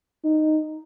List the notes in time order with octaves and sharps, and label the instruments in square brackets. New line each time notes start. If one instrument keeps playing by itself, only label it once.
[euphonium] D#4